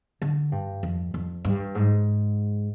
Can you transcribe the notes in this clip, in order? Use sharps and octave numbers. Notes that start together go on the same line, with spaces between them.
D3
G2
F2
F2
G2
G#2